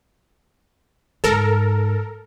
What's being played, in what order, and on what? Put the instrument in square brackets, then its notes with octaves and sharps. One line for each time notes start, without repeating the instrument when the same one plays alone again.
[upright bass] G#2 [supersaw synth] A4 A#4